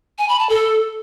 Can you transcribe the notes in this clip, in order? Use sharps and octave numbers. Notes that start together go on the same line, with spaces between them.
G#5
B5
A5
A4